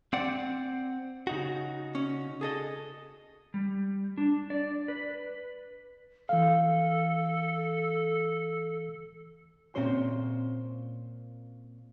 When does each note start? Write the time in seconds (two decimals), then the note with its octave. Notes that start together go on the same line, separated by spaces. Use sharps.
0.13 C4 D5 F#5
1.27 C#3 D#4 F#4
1.95 C#4
2.41 G#4 A4 D#5
3.54 G3
4.18 D4
4.50 D5
4.88 B4
6.29 E3 A4 F5
9.75 A#2 C4 C#4 C5 C6